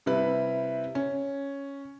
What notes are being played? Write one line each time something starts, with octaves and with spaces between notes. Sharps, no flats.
C3 G3 E4 B4
C#4